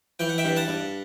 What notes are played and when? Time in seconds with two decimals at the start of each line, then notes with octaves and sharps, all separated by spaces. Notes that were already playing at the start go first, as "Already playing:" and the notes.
0.19 E3 G5
0.29 F#5
0.38 E5 G5
0.45 G2
0.56 F#5 A5
0.68 G2